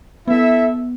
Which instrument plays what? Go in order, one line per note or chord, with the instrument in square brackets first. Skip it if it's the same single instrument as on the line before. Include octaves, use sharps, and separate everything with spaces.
[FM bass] B3 [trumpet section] E4 A4 E5